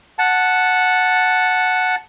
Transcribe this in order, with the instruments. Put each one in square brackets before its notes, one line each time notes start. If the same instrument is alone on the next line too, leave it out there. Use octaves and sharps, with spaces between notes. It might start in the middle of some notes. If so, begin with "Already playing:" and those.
[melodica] F#5 A5